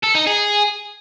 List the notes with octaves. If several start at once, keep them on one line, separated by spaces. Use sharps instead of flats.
A4
D#4
G#4